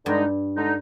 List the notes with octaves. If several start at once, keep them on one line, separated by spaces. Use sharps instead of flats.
G2 D3 G#3 D#4
D3 G#3 D#4